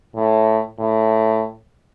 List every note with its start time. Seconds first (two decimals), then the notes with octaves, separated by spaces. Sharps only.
0.15 A2
0.79 A2